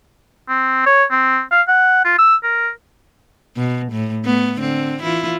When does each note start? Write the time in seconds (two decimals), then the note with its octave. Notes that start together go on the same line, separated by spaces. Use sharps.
0.48 C4
0.86 C#5
1.11 C4
1.52 F5
1.68 F#5
2.04 F4
2.18 E6
2.43 A#4
3.57 B2
3.92 A2
4.25 A3 B3
4.59 D3 C4
5.03 E3 E4 F4